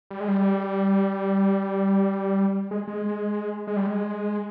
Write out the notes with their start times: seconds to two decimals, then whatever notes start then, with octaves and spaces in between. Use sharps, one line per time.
0.11 G3
0.20 G#3
0.28 G3
2.71 G#3
2.88 G#3
3.67 G#3
3.76 G3
3.86 G#3